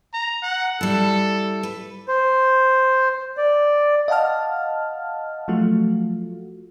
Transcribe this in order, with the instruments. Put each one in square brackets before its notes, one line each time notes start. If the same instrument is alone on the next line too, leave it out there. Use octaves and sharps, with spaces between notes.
[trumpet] A#5
F#5
[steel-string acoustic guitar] G3 E4 [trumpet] A4
[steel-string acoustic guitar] B4
[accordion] C5
D5
[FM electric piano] D#5 F5 F#5 A5 F6
F3 F#3 A3 F4 F#4